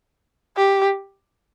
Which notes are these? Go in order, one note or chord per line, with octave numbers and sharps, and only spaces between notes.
G4